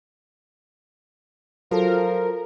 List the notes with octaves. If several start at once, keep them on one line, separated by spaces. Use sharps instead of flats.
F3 F#3 F4 A4 A#4